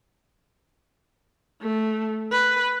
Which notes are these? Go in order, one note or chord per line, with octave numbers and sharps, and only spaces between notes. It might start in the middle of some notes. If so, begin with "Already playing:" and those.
A3
B4